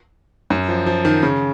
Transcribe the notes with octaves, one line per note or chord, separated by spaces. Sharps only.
F#2
F3
F3
D#3
C#3